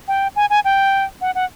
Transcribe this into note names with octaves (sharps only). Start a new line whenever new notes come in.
G5
G#5
G#5
G5
F#5
F#5